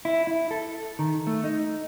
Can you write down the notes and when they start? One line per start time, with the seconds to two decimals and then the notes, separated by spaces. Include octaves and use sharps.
0.05 E4
0.27 E4
0.51 A4
0.99 D#3
1.27 A3
1.44 D#4